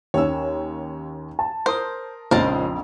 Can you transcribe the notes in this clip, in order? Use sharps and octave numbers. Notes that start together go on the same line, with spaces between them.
D#2 C#4 C#5 E6
A5
A#4 C5 C6 D#6
A#1 F2 C#3 G#3 D#4 A#4 C5 A5